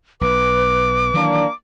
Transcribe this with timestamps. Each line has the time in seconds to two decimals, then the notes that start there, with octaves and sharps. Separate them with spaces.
0.21 B1 B4 D6
1.14 D#3 E3 F#3 A#3 D4